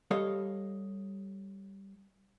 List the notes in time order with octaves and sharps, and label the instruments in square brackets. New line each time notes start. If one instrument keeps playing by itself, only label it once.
[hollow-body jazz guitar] G3 A4 C#5 D#5 F5